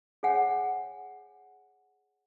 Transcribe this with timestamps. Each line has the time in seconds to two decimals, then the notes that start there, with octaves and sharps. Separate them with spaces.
0.23 G#4 C5 C#5 F#5 G#5